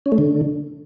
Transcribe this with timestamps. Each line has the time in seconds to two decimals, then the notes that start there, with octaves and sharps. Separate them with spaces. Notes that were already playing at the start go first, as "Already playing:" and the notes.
0.06 C#4
0.12 A3
0.18 D3